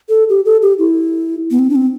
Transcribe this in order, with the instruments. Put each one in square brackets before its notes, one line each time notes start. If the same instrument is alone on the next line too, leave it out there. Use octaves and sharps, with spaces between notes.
[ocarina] A4
G4
A4
G4
E4
B3
C4
D4
C4